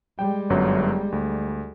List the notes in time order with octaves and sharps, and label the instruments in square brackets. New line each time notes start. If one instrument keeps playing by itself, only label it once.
[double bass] G3 G#3 [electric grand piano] G5
[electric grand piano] G1 F#2 F#3
D2